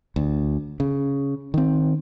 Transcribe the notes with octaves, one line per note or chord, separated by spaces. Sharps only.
D2
C#3
D#3 C4